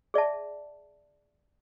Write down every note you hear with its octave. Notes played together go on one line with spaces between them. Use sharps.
G#4 D5 E5 A5